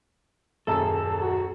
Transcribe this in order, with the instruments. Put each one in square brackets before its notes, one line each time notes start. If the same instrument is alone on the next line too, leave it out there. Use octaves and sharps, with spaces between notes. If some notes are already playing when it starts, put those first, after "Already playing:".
[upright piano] D#1 F#2 G#4 [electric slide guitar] A4
[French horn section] F#4